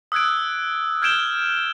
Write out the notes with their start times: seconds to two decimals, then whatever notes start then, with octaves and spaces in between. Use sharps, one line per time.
0.12 D#6 E6 F#6 G#6 D7
1.02 F6 G6 G#6 D7 E7 G7